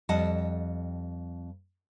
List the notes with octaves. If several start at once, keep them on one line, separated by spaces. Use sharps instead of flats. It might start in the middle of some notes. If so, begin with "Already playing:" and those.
F2 G3 D#5 F#5 A5